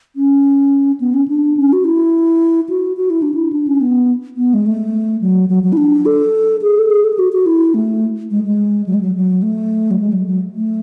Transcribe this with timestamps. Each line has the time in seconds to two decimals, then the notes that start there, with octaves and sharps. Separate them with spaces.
0.16 C#4
1.00 B3
1.14 C#4
1.28 D4
1.57 C#4
1.73 F#4
1.85 E4
2.69 F#4
2.97 F#4
3.10 E4
3.22 D4
3.34 E4
3.53 D4
3.67 C#4
3.81 B3
4.37 B3
4.54 G#3
4.66 A3
5.21 F#3
5.49 F#3
5.63 F#3
5.73 E4
5.77 D4
6.06 A4
6.62 G#4
6.79 A4
6.90 G#4
7.04 A4
7.13 G#4
7.19 F#4
7.33 F#4
7.46 E4
7.74 A3
8.31 G#3
8.44 G#3
8.86 F#3
8.94 G#3
9.01 F#3
9.15 F#3
9.42 A3
9.91 F#3
10.00 G#3
10.13 F#3
10.27 F#3
10.55 A3